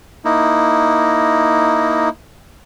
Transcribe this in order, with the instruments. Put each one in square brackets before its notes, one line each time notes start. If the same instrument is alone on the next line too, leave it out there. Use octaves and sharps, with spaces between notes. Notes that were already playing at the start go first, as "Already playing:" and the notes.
[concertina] A#3 D#4 E4